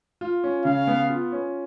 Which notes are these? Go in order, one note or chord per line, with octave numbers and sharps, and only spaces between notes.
F4
C#4
C#3 F5
B3
F4
C#4